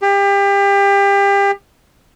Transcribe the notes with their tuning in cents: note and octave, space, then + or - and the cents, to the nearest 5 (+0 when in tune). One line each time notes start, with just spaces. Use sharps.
G4 +30